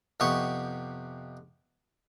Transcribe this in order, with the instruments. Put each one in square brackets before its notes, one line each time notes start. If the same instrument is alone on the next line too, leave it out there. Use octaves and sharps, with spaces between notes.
[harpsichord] F2 C3 B3 G4 C#6 D#6